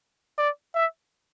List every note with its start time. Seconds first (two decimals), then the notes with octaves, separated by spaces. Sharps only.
0.38 D5
0.75 E5